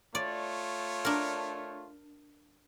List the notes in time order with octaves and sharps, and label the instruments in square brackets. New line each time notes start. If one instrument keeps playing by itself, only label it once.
[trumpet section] A3 F4 C#5 [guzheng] D5
[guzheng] D4 A#4